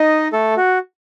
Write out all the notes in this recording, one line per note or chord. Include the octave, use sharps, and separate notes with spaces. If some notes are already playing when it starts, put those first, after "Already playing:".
Already playing: D#4 D#5
A3 A4
F#4